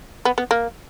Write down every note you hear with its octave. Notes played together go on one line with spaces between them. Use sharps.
B3
B3
A#3